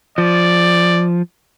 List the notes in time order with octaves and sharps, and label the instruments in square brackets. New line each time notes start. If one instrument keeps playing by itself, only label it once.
[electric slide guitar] F3 [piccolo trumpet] D5